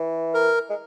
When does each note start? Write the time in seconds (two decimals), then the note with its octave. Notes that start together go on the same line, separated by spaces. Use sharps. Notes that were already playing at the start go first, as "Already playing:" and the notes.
Already playing: E3
0.34 A#4
0.69 G#3